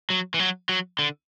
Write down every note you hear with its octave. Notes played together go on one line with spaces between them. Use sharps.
F#3
E3
F#3
F#3
D3